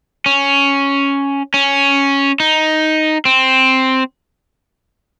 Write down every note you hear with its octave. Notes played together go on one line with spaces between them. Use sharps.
C#4
C#4
D#4
C4